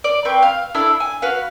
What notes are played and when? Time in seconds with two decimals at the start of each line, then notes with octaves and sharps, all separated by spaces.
0.04 D5
0.25 C4 B4 G5 C#6
0.42 F5
0.74 D4 E4 A4 E6
1.00 G#5
1.22 F#4 B4 F5